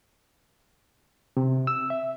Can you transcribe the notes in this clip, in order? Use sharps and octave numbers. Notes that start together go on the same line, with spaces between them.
C3
E6
E5